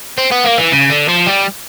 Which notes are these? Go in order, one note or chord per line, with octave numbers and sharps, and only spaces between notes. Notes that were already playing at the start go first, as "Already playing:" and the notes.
C4
B3
A#3
E3
C#3
D3
F3
G3